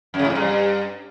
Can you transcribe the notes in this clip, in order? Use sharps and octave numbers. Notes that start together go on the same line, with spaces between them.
F#2
C#3
A2
F2
G2